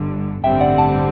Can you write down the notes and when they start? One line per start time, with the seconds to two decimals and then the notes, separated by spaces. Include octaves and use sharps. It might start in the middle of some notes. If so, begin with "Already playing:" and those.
Already playing: G1 G2 D3
0.44 A1 G2 D3 G3 C4 E5 G5
0.61 D5 F#5
0.78 F#5 A5